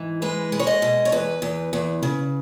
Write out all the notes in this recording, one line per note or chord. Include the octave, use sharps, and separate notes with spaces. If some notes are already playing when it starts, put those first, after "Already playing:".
Already playing: G#2 E3
G#3 B4
G#3
C#5
D#5
B2
C#5
E2 B4
E2
E2
C#3